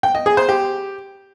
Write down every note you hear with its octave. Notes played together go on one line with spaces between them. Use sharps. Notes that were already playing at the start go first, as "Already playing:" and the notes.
G5
D#5
G#4
C5
G4